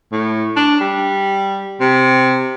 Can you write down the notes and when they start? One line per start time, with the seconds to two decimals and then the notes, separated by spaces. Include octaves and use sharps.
0.12 A2
0.56 D4
0.80 G3
1.80 C3